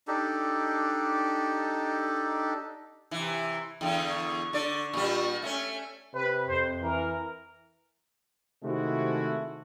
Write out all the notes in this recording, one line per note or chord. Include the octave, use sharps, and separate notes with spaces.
D4 D#4 G4 A4
C3 E3
E2 D3 G5
C#6
D3 D5
A#2 G3
A3 B3 C#4
C3 B4
F2 C5
E3 A#4
C3 D#3 G#3 A3 E4 F#4